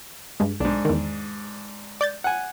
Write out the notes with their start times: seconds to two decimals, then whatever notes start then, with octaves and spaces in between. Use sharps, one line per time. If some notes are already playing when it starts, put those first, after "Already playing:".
0.40 G2 G#3
0.60 B1 G#2 D4
0.85 E2 D#3
2.01 D5 G6 A6
2.24 F#5 G#5